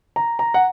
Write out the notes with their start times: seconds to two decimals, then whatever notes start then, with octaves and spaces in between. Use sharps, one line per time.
0.16 A#5
0.39 A#5
0.54 F#5